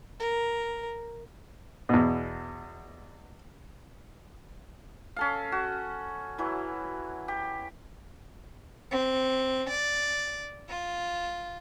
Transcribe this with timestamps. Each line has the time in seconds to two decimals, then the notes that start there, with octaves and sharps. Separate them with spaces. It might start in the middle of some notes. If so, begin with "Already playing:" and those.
0.20 A#4
1.89 E2 B2
5.16 C#4 A4 F5
5.52 F#4
6.38 E3 F#3 E4
7.28 G4
8.92 C4
9.70 D5
10.68 F4